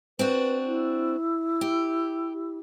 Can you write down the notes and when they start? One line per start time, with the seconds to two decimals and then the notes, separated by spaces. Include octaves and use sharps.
0.19 C4 D4 F#4 B4
0.66 E4
1.61 G4